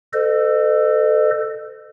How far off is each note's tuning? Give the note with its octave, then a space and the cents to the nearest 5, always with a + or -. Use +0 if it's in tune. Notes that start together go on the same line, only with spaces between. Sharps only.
A4 +10 C5 -45 D#5 -35